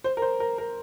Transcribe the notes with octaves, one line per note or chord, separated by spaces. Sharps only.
C5
A#4
C5
A#4
A#4